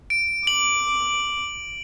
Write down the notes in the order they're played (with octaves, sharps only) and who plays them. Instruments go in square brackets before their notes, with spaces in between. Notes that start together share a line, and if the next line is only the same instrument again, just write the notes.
[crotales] D7
[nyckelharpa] D6 [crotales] F#7